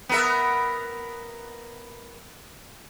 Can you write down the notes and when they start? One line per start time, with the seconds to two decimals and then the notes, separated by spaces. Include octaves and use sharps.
0.09 B3 A#4 E5